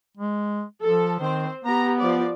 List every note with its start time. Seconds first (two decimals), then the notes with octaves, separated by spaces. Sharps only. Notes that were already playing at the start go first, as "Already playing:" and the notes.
0.17 G#3
0.82 F3 A4
1.20 D#3 C4 C5
1.65 B3 G4 A#5
1.99 F3 D5